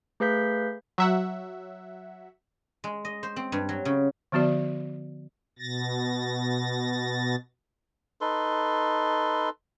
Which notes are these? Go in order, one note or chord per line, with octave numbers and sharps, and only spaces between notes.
A3 G#4 B4 F5 G6 B6
F#3 E5 F#5
G#3
D#5
C5
C4
G2
F#3
C#3
D3 F3 B3 F#4 D5
B2 A6 A#6
D#4 A4 B4 C6